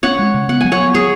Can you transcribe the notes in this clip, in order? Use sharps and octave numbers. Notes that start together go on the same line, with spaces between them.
C#4 C#5 F#5
G#3
C#3
B3 F#5
F#3 G#5
C#5 F#5
B3
F#3 G#4 C#5